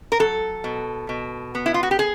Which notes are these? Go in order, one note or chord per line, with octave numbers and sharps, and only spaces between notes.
A#4
F#3 A4
B2
B2
B3
E4
F4
F#4
G4
G#4